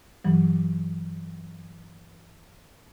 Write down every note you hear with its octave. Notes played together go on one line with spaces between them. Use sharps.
G2 E3 F#3